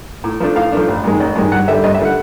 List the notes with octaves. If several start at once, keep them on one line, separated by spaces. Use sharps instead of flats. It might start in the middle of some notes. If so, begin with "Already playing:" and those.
A2
F3 A3 D4
A2 F5
F3 A3 D4
A1
G2 D#3 G#3
A1
G2 D#3 G#3
G2 F#5
D3 G3 E5
G2 D#5
E5
D3 G3 F#5